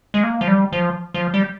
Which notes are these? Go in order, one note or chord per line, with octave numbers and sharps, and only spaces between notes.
G#3
A#3
F3
G3
F3
F3
G3